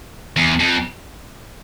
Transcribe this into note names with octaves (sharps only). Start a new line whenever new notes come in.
E2
F2